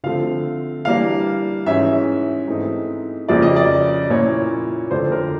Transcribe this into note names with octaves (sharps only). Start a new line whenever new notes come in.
D3 F3 A3 C4 F5
E3 G3 A#3 D4 F5
G#2 E3 G#3 C#4 E5
G#2 E3 A3 C4 D#4
F2 C#3 F3 A#3 D5
D#5
D5
A#2 F3 A#3 C#4 E4 C#5
F2 D3 F3 A3 D4 C5
A#4